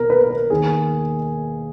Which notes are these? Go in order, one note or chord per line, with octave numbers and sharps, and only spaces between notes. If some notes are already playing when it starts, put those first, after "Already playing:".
Already playing: B1 B2 A#4
B4
B4
A#4
D#2 D#3 G#4